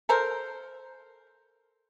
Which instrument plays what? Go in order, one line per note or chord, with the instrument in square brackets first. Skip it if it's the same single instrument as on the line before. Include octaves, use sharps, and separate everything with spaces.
[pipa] A4 A#4 C5